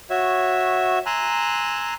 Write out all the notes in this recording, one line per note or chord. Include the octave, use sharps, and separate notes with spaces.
F#4 C#5 E5
G#5 A#5 C6 E6 F#6